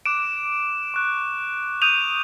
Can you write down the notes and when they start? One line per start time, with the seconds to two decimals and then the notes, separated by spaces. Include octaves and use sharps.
0.06 D6 F#6 D7 E7
0.94 C#6 F#6
1.82 D#6 G6 D#7 F7